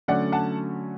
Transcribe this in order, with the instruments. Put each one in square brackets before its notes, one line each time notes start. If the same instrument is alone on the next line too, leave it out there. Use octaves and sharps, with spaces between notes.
[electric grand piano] D3 F#3 A3 C#4 [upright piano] D5 F#5
[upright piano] F#5 A5